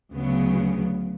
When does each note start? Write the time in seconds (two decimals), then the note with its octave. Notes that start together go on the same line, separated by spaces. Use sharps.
0.11 D2 C#3 F#3 B3